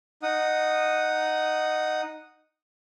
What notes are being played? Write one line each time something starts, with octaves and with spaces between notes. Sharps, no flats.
D#4 F#5 D#6